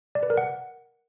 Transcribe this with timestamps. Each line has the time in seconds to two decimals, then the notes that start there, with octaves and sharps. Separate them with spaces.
0.15 D5
0.23 B4
0.30 A#4
0.37 F#5